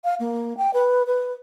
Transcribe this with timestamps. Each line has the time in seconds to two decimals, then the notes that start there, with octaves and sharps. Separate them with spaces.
0.04 F5
0.20 A#3
0.57 G5
0.73 B4
1.07 B4